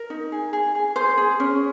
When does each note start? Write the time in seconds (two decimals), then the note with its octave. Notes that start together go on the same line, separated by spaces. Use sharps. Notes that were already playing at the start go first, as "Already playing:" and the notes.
Already playing: A#4
0.10 D#4
0.32 G#4
0.53 G#4
0.75 G#4
0.96 G#4 C5
1.18 G#4
1.40 C#4